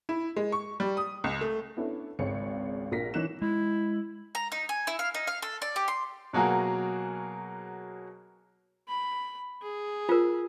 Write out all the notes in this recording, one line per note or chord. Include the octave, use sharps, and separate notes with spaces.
E4
G#3
C#6
G3
D#6
C#2
A3
B3 C#4 D4 E4 A4
G#1 C#2 C#5 C#7
A#1 F4 A#4 A#6 B6
E3 C#4 D#4 F#6 E7
G#3 E4
A#5
D#4
G#5
E4
F5
D#4
F5
A4
D5
G4
C6
B2 F#3 A#3 F#4 G#4 A#4
B5
G#4
F4 A#4